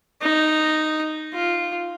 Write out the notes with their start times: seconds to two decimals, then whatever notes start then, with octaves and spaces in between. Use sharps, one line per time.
0.22 D#4
1.33 F4